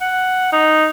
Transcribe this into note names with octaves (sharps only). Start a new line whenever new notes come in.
F#5
D#4